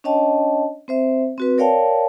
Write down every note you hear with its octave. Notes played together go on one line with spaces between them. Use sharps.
C#4 D4 C#5 D#5 G5 A5
C4 C5 E5
C4 F#4 B4
A#4 C#5 D5 F5 G5 A5